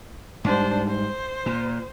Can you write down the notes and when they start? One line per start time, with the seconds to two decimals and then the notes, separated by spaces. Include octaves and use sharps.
0.44 G#2 G3 D4 C5
0.88 C5
1.46 A#2